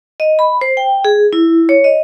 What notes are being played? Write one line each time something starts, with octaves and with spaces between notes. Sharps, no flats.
D#5
B5
C5
G5
G#4
E4
C#5
D#5